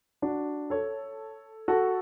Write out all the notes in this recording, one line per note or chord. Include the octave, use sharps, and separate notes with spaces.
D4 F#4
A4 C#5
F#4 A4